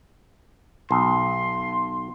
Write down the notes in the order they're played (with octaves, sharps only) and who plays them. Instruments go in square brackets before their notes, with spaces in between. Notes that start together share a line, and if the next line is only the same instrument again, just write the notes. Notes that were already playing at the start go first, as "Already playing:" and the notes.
[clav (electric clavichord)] B1 [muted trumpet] C6